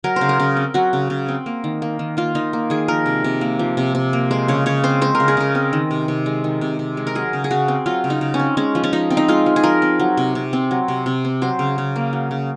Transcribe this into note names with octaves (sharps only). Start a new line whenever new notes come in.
F#3 A#4
C#3 C5
A#4
C#3
C4
F#3 F#4
C#3
C#3
C4
A#3
D#3
A#3
D#3
A#3 F4
D#3 D#4
A#3
D#3 G#4
F3 A#4
C3
C3
A#3
F3
C3
C3
A#3
G#3 C5
C#3 C#5
C#3 C#5
C4 C5
G#3 C5
A#4
C#3
G#4
C#3 A#4
C4
D#3
C3
C3
G#3
D#3
C3
C3
G#3
A#4
F#3 G#4
C#3
G#4
C#3 F#4
C4
F#3 F4
C#3
D#4
C#3
C#4
C4
G#3 C#4
F3
C#4
F3 D#4
C4
D#4
G#3 F4
F3
G#4
F3 A#4
C4
F#3
C3
C3
C4
F#3
C3
C3
C4
F#3 C5
C#3
C#3
A#3
F#3
C#3